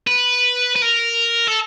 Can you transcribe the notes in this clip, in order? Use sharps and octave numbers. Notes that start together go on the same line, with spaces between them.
B4
B4
A#4
A4